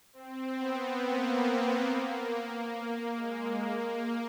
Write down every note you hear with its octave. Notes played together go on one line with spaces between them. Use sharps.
C4
B3
A#3
G#3
A#3